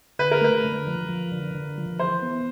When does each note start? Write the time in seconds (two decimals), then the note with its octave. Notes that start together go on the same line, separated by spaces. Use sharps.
0.19 D3 B4
0.31 A#4
0.41 A3 B4
0.64 D3
0.87 F3
1.09 F3
1.32 D3
1.55 D3
1.77 F3
1.99 E3 C5
2.22 B3